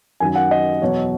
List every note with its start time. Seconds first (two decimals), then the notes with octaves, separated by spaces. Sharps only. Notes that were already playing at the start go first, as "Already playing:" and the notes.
0.20 F#2 D#3 F#3 G#5
0.36 F#5
0.51 D#5
0.81 E2 B2 F#3 C#5